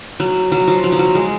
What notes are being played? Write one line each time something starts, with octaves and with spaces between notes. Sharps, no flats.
F#3
F#3
F3
F#3
F3
F#3
G#3